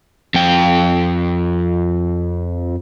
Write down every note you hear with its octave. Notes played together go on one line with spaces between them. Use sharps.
F2 G5